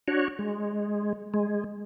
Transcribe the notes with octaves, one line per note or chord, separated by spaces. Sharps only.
D4 F#4 C#5
G#3
G#3